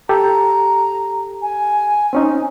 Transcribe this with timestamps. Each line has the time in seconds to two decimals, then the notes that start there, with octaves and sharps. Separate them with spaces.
0.09 G4 A4 A#5
1.42 G#5
2.13 C4 C#4 D#4